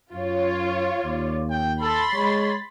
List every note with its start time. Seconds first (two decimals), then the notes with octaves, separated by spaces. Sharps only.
0.13 F#2 F4 C#5
1.04 D#2 D5
1.50 G5
1.81 A4 B5 C6 A6
2.13 G#3 C#5